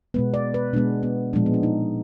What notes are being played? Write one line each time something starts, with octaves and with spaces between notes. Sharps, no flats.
B2 G#3 B3 B4
D5
B4
B2 G#3 B3 D4
B3
A#2 F3 G#3 D4
B3
D4
D#4